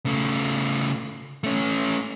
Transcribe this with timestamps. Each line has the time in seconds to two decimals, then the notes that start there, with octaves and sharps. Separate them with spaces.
0.06 C#3 A3
1.44 A3 C#4